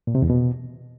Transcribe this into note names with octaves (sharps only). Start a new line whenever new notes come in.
A#2
C3
E2
B2